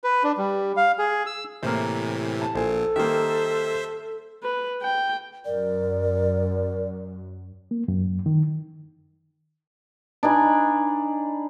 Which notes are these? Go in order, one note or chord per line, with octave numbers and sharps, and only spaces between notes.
B4
D4
G3
F5
G#4
E6
A2 C3 E3 A#3 C5
A5
A#1 A#2 A4 C5 G#5
D#3 G3 A#3 C5 E5
B4
G5
F#2 A#4 D5
A#3
F#2
D#3
D4 D#4 G#5 B5